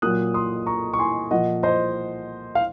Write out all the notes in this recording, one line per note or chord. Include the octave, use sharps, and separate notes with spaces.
A#2 F#3 D#6 F#6
C6 D#6
A#5 C#6
C#6
G#5 C6
A#2 F3 D#5 F#5
C5 D#5
F5